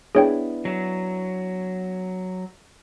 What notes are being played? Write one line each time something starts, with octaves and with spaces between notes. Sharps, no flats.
B3 D4 E4 G#4 C#5 G5
F#3